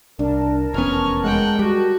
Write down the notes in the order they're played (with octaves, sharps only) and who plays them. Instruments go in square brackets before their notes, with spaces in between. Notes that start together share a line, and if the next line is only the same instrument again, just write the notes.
[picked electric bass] C2 [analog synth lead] D4 [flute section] A#4 A5
[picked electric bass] F1 E2 B3 [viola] C#4 C#5 [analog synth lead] F6
[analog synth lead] G#3 [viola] F#5 G5
[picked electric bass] G3 [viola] F#4